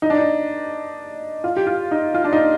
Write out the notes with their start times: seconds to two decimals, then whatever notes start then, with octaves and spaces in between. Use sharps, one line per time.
0.02 D#4
0.10 D4
0.17 D#4
1.44 F4
1.57 G4
1.67 F4
1.91 D#4
2.14 F4
2.24 D4
2.33 D#4